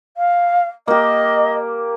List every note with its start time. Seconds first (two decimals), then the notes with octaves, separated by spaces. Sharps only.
0.17 F5
0.88 A#3 G4 D#5